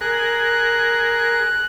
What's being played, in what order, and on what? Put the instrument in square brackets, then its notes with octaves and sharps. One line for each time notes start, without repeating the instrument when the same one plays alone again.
[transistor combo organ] G#4 A#4 [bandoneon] F#6